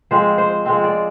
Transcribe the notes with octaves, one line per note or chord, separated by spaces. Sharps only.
F3 G#3 C4 C5
C5
F3 G#3 C4
D5